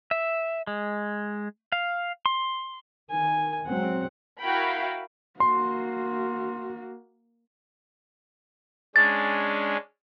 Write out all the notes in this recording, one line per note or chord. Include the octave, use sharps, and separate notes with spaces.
E5
G#3
F5
C6
D#3 G#5
F#3 G#3 C4 F#5
E4 F#4 A#4 F5 G5 B5
A#3 F#4 C6
G#3 C#4 D4 A6